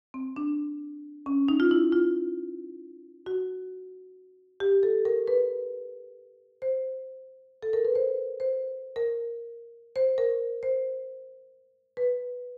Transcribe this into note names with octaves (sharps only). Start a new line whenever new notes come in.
C4
D4
C#4
D#4
F4
E4
F4
F#4
G4
A4
A#4
B4
C5
A4
A#4
B4
C5
C5
A#4
C5
A#4
C5
B4